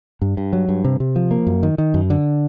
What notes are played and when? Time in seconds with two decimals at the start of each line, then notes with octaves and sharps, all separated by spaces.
0.22 G2
0.37 G2
0.53 F#3
0.69 G2
0.84 C3
1.00 C3
1.16 F3
1.31 A#3
1.47 F#2
1.63 D#3
1.78 D#3
1.94 F#2
2.10 D3